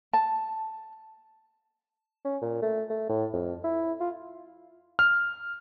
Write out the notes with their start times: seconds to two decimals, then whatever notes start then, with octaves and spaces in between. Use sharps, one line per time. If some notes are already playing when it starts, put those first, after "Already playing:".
0.13 A5
2.25 C#4
2.42 A#2
2.62 A3
2.90 A3
3.09 A2
3.33 F2
3.64 E4
4.00 F4
4.99 F6